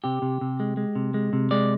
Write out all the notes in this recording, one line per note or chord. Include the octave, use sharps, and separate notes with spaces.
C3 G4
C3
C3
G#3
G#3
C3
G#3
C3
G#3 D5